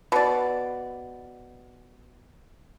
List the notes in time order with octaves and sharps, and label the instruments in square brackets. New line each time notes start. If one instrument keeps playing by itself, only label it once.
[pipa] B2 D5